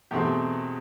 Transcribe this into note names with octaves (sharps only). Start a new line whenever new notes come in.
E2 B2 A3 C4 G4